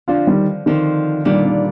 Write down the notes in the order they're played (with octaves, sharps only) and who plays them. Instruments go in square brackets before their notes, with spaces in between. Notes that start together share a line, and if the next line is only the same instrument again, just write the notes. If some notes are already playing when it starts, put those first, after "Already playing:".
[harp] D3 F3 C4 [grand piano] D4 F4
[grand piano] D#3 G3
[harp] D3 F3 C4 [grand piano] D#3
[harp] A#2 G3 D4 [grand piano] D#3
[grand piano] D#3